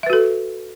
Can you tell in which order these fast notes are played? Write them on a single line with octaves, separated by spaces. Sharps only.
E5 B4 F#4 A4